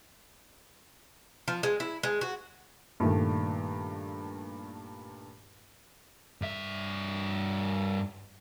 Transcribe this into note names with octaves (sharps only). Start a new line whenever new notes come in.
F3
G#3
E4
G#3
F#4
G2 A#2 D#3 A3
G2 E5